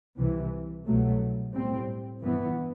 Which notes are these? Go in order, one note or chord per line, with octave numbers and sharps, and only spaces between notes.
C2 C3 E3
C2 B2 F#3 A3
A2 G3 C4
G2 E3 B3